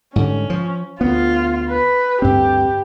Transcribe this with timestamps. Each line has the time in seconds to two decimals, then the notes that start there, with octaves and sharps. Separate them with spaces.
0.16 G#2 D3 G3 C#4
0.50 F3
1.01 D2 B3 F4
1.70 B4
2.22 D2 G2 C4 G4